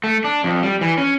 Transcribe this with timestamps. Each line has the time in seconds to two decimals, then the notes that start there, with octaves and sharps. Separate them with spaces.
0.04 A3
0.24 D4
0.44 F2
0.62 G3
0.81 E3
0.98 C#4